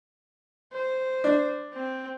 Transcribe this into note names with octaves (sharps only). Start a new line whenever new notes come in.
C5
D4
C4